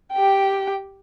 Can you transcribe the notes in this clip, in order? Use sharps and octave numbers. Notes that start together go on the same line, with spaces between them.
G4 G5